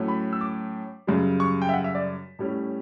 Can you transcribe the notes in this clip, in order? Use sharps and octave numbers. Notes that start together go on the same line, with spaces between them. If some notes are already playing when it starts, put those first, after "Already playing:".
Already playing: A2 F#3 A3 C#4
B5
E6
D6
F#2 C#3 G3
C#6
G5
E5
F#5
E5
D5
A2 G3 C#4